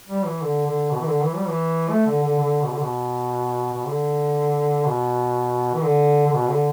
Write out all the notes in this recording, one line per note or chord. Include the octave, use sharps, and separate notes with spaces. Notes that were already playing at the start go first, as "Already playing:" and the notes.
G3
E3
D3
D3
B2
E3
D3
E3
G3
E3
A3
D3
D3
D3
B2
D3
B2
B2
D3
B2
E3
D3
D3
B2
D3